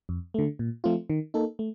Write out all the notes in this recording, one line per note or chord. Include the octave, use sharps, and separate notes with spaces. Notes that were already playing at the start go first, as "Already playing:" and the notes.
F2
D3 A3
A#2
F3 A3 C4 F4
D#3
A#3 D#4 A4
A3